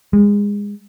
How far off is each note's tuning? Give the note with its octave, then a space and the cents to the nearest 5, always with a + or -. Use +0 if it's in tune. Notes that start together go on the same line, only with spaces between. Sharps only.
G#3 -25